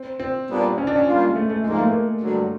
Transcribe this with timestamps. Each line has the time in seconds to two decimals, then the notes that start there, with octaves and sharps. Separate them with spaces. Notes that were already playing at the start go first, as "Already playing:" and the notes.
Already playing: C4
0.20 C4
0.48 A#2 G3 B3 D4
0.78 C#4
0.87 D4
0.96 C#4
1.06 G3 A#3 D4 F4
1.23 G#3
1.35 A3
1.49 A3
1.64 G#2 F3 G#3 A#3
1.78 A3
1.92 A#3
2.21 G2 D3 F#3